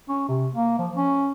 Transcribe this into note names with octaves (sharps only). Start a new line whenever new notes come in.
C#4
C3
A#3
F3
C#4